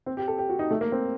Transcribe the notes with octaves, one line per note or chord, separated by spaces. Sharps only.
C4
G4
A4
G4
F#4
D#4
A3
A#3
C4